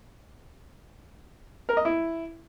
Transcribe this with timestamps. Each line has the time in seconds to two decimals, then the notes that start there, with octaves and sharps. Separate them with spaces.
1.69 A#4
1.77 D#5
1.85 E4